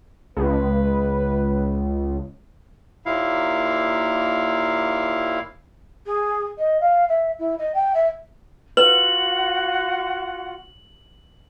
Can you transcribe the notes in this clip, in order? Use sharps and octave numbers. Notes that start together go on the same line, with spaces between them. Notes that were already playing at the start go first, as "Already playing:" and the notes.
C#2 B4
D#2 A#2 E4 F5
G#4
D#5
F5
E5
E4
D#5
G5
E5
F4 F#4 B4 F#5 F#7